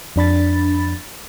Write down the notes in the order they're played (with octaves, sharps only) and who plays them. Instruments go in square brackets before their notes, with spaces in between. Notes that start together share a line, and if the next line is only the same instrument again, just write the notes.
[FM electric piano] F2 D4 B5 A6